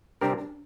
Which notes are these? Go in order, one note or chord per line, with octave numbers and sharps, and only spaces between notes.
C3 G3 C4 D4 G4 A#4
D4